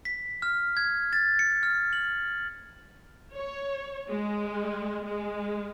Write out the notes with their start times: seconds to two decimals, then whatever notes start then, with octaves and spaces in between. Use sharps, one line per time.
0.05 B6
0.42 F6
0.77 G#6
1.13 A6
1.39 C#7
1.63 F6
1.93 F#7
3.33 C#5
4.09 G#3
5.04 G#3